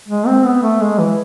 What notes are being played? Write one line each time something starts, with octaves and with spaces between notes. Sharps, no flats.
G#3
C4
B3
A3
G#3
E3